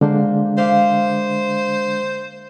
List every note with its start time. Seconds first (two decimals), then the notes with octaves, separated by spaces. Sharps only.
0.01 D3 G#3 A#3 D4 C5
0.58 C5 E5 F5 D6